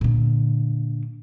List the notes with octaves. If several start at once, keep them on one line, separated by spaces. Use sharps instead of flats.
A#2 D3